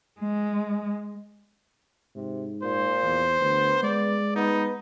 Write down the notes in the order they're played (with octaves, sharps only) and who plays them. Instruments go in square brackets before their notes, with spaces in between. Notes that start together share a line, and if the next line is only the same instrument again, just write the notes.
[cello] G#3
[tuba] G#2 [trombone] C3
[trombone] A#2 [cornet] C5
[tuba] E2
[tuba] D2 [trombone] B3
[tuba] G#3 [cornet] D5
[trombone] B3 [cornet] D#4